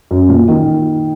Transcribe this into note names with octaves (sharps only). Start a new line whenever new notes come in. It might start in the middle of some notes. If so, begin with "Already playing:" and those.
F#2
A#2
D#3